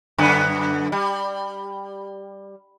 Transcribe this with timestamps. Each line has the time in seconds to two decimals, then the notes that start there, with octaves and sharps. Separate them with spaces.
0.18 F#2 D3 B3
0.92 G3